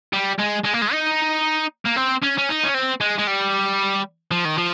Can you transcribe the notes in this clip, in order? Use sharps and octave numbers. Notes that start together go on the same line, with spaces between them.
G3
G#3
G#3
A#3
G#3
D#4
A#3
C4
C#4
C#4
D#4
C#4
C4
G#3
G#3
G3
F3
D#3
F3